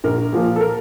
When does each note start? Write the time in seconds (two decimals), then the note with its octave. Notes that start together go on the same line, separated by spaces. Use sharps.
0.04 A#1 A#4
0.33 A#2 F3 A#3
0.56 A4
0.61 A#4